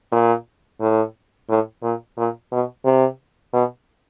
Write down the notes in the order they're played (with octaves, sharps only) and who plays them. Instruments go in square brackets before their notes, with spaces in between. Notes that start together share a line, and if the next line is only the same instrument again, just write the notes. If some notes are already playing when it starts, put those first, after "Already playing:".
[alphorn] A#2
A2
A2
A#2
A#2
B2
C3
B2